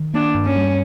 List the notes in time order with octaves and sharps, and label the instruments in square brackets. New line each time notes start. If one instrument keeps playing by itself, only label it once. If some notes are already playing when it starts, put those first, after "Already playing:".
Already playing: [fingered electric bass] D#3
[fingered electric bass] A#3 [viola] D4
[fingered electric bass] G2
[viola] C#4
[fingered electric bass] G3